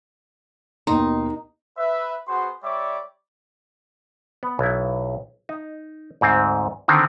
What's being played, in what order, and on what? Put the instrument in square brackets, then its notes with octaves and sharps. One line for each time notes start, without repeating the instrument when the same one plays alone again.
[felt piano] D#2 B2 C6 [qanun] D#4
[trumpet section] B4 E5
B3 F#4 G#4 C5 C6
G3 C#5 D5 E5 C#6 D6
[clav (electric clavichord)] B3
B1 E4
D#4
D2 G#2 C4
D3 D#3 C4